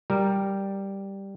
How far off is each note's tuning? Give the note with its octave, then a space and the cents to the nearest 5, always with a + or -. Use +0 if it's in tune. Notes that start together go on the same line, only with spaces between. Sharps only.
G3 +0 A#4 +5